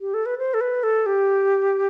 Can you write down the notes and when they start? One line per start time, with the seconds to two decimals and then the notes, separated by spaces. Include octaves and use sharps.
0.01 G4
0.14 A4
0.26 B4
0.38 C5
0.54 A4
0.61 B4
0.83 A4
1.06 G4